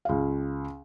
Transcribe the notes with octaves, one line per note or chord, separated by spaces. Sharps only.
C#2 F5